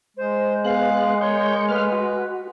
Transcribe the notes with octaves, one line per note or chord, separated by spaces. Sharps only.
G#3 C5
B3 G#4 F5 F#6
A#4 C#5 C#6 G6
A3 B4 F5 F6
F#4